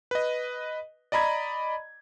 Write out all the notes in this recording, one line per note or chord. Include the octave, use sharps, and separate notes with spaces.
B4 D#5
D5 D#5 A#5 B5 G#6